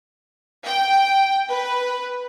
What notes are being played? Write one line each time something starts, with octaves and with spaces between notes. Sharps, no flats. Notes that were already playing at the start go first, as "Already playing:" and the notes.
G5
B4